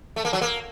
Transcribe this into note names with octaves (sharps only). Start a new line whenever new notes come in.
A3
A#3
F#3
A#3